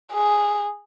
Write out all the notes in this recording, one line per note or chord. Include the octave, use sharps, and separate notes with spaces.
G#4